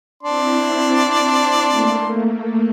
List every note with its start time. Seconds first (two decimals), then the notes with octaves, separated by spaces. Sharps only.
0.23 C4 D4 E4 D5 C6
1.70 A3 A#3